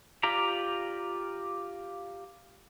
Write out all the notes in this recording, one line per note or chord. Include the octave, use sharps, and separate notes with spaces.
F4 G4 D5 A#5